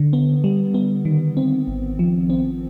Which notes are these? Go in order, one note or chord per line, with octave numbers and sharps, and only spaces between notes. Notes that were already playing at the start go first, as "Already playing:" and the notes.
Already playing: D3
B3
G3
B3
D#3
C4
G#1
F3
C4